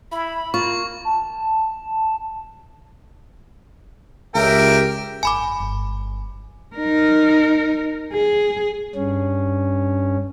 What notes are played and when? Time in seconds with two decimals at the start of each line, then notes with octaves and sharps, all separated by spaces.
0.12 E4 B5
0.54 A#3 F4 C#6
1.05 A5
4.35 C#2 G4 A#4 E5 G5
5.23 G#1 F#2 G#5 B5 D6
5.60 G1
6.76 D#4 A#4
8.13 G#4
8.95 G2 C#4